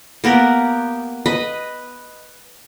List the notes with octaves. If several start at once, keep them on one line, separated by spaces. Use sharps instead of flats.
A#3 B3 G4 A#4
B4 D#5 B5